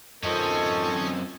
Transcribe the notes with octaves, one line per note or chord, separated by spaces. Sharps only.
F#2 D#3 C4 C#4 F4 A4 D#5